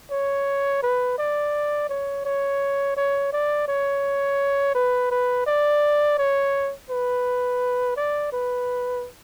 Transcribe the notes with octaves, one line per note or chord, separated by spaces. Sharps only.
C#5
B4
D5
C#5
C#5
C#5
D5
C#5
B4
B4
D5
C#5
B4
D5
B4